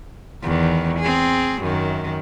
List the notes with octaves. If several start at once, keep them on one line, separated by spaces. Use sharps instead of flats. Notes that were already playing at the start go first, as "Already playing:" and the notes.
E2 D#3
C4 G#4
F#2 D#3